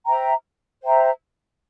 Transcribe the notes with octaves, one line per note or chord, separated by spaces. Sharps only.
C5 E5 G5 A#5
C5 E5 G5 A#5